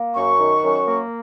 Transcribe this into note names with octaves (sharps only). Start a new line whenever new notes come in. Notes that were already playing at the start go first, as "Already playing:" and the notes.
Already playing: A#3
F#2 C#6
D#3
F#2
A#3